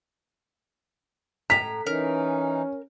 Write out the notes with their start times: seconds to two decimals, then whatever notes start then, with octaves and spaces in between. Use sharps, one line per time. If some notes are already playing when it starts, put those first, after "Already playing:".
1.50 A2 A#5 B6
1.87 E3 C#4 D#4 A#4